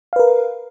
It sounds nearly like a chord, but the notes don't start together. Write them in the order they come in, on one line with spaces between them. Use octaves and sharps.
F5 B4 A#4